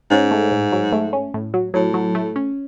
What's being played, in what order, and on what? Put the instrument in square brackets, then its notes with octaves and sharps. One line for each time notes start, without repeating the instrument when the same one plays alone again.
[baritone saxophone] G#2 [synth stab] C#4
[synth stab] A3
A2
F#3
A3
C#4
A2
F#3
[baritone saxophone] A2 [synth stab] F#3
[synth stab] F#3
A3
C#4